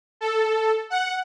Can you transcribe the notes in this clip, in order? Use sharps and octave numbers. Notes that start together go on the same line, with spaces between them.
A4
F#5